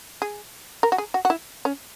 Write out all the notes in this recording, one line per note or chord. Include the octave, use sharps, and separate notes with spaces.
G#4
A#4
F#4
G#4
F#4
F#4
E4
C#4